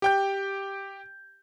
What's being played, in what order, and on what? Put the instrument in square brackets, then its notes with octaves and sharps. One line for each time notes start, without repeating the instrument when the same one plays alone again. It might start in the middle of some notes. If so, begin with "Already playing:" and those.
[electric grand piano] G4 G5 G6